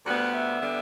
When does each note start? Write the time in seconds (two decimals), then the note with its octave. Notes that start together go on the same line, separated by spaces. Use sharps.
0.06 D2 D3 G3 B3 F#5
0.33 E5
0.60 D3 G3 B3